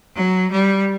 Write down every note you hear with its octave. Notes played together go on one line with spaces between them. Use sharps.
F#3
G3